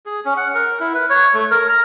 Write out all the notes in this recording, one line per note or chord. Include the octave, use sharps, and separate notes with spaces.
G#4
C#4
F#5
A#4
E4
B4
C#5
A3
A#4
A#5